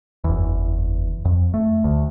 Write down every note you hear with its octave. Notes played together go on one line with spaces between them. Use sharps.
F#1 E2
F2
A3
D2